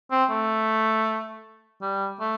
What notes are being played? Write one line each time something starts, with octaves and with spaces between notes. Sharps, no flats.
C4
A3
G3
A3